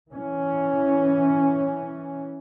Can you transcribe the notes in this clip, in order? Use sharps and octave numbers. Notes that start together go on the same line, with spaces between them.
E3 C#4